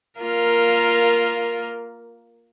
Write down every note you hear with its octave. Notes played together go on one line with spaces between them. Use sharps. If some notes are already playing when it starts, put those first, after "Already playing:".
A#3 F4 A#4